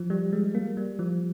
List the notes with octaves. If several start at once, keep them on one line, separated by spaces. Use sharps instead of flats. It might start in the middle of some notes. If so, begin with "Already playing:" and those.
Already playing: F3
G3
G#3
A#3
G3
F3